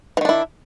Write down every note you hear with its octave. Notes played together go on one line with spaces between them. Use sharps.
D#3 E3 D4 E4